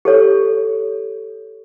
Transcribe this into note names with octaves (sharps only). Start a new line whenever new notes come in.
G4 A4 C#5